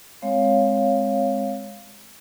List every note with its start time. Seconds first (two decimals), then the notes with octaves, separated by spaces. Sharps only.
0.22 G#3 C4 C#5 F5